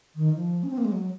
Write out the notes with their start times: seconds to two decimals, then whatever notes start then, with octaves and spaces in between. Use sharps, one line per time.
0.16 D#3
0.35 F3
0.63 C#4
0.70 C4
0.78 A#3
0.85 G#3
0.92 F#3